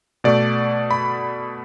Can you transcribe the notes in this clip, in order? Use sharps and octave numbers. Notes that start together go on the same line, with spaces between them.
B2 A3 D5
B5